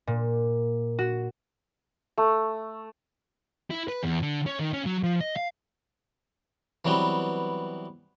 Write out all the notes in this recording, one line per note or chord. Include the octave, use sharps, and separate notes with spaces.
A#2
F#4
A3
E4
B4
E2
D3
C#4
D#3
C#4
F#3
F3
D#5
F5
E3 F#3 G3 B3 C4